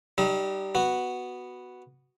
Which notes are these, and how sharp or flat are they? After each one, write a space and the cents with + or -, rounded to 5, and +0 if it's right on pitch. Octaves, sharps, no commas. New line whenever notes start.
G3 -15 D#4 -35 D#5 +45
B3 +0 F#4 +0